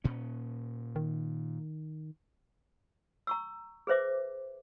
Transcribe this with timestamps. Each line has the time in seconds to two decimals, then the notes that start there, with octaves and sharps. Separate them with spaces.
0.04 A#2 C#4
0.96 D#3
3.27 A#5 C#6 E6
3.87 G#4 B4 C5 E5 D6